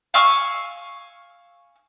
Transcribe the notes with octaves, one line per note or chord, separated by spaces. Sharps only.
F5 G#5 C#6 E6